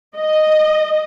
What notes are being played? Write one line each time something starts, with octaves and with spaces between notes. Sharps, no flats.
D#5